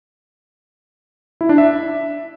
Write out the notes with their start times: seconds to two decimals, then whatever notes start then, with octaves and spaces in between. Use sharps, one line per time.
1.41 E4
1.49 D4
1.58 E5